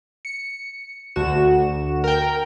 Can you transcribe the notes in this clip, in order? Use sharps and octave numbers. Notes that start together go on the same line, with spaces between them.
C#7
D2 F#4 E7
A#4 G5